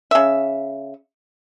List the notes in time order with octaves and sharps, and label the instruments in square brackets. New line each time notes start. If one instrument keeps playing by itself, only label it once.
[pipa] C#3 E5